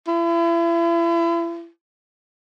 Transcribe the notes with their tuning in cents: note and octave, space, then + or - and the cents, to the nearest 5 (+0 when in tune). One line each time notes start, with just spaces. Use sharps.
E4 +35